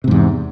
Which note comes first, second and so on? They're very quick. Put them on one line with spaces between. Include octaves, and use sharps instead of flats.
C3 G#2 E2